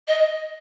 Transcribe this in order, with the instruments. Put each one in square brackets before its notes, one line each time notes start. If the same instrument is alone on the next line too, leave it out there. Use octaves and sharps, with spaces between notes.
[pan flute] D#5